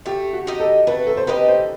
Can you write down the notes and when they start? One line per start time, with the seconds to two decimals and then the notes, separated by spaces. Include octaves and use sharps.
0.06 A3 G4
0.33 F#4
0.47 D#4 G4 D#5
0.60 A4
0.87 A3 B4
1.07 A4
1.17 C5
1.27 D#4 G4 B4 D#5
1.48 C5